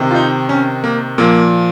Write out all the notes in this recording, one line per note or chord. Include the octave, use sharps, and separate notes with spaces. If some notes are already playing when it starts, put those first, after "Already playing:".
Already playing: C3 D#3
F4
D#4
C#4
A#3
A#2 F3 A#3